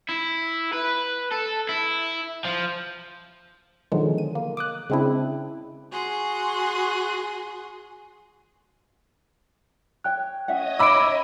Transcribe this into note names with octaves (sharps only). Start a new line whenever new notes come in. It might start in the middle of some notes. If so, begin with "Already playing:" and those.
E4
B4
A4
E4
F3
B2 D3 D#3 F3 F#3 G#3
D#7
A#3
D6 D#6 F#6
C#3 G#3 C4 D4 E4
F#4 G#4 C6
C#5 G5 F#6
C#4 C#5 D#5 E5 F#5 D#6
B5 D6 E6 D7